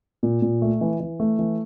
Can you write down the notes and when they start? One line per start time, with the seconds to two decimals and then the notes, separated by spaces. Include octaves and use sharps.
0.23 A#2
0.42 A#2
0.62 A3
0.81 E3
1.00 E3
1.20 A3
1.39 E3